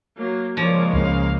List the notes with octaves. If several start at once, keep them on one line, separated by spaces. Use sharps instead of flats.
F#3 A#3
C#3 F3 G#3 A#3 C#5 D5
C#2 F5